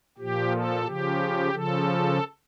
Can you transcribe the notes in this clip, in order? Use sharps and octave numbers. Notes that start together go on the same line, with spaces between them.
A#2 F3 G4
A4
C#3 F3 G4
C#3 F3 A4